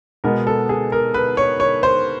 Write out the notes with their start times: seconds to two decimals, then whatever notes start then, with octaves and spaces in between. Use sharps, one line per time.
0.24 B2 G#3 B3 A#4
0.47 A4
0.69 G#4
0.92 A#4
1.14 B4
1.37 C#5
1.60 C#5
1.83 C5